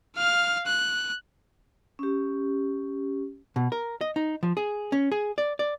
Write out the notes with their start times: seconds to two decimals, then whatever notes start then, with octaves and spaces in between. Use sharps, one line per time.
0.16 F5 F6
0.66 F#6
1.99 C#4 G4
3.56 B2
3.72 A#4
4.01 D#5
4.16 D#4
4.43 F3
4.57 G#4
4.92 C#4
5.12 G#4
5.38 D5
5.59 D5